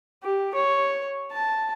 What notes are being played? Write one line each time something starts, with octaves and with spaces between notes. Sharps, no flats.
G4
C#5
A5